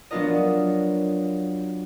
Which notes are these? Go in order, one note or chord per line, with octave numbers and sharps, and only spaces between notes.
F#3 B3 D4 F4 A#4 D#5